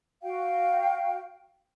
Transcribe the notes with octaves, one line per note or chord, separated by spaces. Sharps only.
F#4 F5 G5